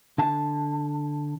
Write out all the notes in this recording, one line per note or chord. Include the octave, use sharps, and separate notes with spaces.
D3 A5